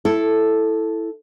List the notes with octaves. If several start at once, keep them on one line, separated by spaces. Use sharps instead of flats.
E4 A4